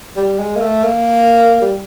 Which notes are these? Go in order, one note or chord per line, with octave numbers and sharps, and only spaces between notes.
G3
G#3
A#3
A3
A#3
G3